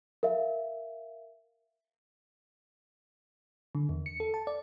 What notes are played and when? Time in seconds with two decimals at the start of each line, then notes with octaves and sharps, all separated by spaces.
0.23 A#4 E5 F5
3.75 D3
3.89 E2
4.06 C#7
4.20 A4
4.34 A5
4.47 D5